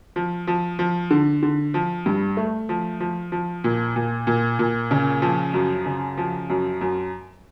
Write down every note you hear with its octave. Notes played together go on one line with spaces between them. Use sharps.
F3
F3
F3
D3
D3
F3
G2
A3
F3
F3
F3
A#2
A#2
A#2
A#2
C#3
F3
F#2
C#3
F3
F#2
F#2